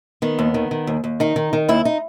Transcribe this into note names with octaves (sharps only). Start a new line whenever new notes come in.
D#3 B3
D#2
D#3
D#3
D#2
D#2
D#3 D#4
D#3
D#3
D#2 E4
D#4